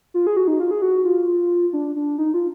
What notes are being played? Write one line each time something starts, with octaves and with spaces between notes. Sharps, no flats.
F4
G#4
F#4
D#4
F4
G#4
F#4
F4
D4
D4
D#4
F4